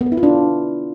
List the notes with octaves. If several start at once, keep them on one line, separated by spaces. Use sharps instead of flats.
B3
B4
E4
F4
D4